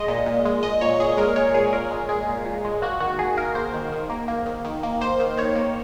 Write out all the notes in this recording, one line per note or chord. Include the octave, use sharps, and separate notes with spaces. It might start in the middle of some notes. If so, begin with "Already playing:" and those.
Already playing: G#3 D#5
A#2
A#2
G#3
G#3 D#5
A#2 C#5
A#2 G#4
G#3 A#4
G#3 C#5
A#2 G#4
A#2 A#4
G#3
G#3 G#4
A#2
A#2
G#3
A#3 F#4
D#3 F#4
D#3 G#4
A#3 A#4
A#3 C5
D#3
D#3
A#3
A#3
D#3
D#3
A#3
A#3 C5
D#3
D#3 C#5
A#3